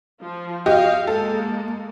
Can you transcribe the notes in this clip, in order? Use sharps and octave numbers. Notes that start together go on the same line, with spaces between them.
F3 F4
F#4 G4 D#5 F5
G#3 A#3 A4